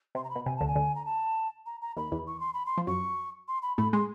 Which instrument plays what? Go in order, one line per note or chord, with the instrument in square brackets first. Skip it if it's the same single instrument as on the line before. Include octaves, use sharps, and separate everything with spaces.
[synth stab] C3 [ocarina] C6
[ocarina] A#5
B5
[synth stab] B2
[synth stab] C3 [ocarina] G#5
[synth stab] D2 D3 [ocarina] A5
[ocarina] G#5
[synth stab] D2 D3
[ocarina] A#5
A5
A#5
A#5
[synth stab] D#2 D#3 [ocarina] B5
[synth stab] E2 E3
[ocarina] C#6
C6
B5
C6
[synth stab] F3
[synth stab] F#2 F#3 [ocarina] C#6
[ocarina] C6
B5
[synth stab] A2 A3 [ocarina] B5
[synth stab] G#3 [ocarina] C6